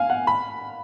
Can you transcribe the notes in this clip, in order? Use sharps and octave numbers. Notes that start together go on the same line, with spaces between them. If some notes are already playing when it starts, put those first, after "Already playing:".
Already playing: F5 G#5
F#5
B5